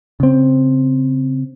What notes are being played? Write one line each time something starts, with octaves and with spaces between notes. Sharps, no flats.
C#3 C4